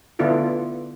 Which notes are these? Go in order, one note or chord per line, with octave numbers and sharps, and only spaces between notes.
D3 B3 D4 E4 F4 A4